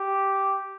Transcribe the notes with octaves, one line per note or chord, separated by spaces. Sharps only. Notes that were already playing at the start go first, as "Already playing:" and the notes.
Already playing: G4